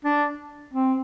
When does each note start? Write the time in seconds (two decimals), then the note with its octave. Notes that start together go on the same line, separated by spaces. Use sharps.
0.05 D4
0.73 C4